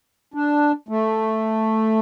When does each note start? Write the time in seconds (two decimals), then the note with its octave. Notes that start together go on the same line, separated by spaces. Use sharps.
0.34 D4
0.89 A3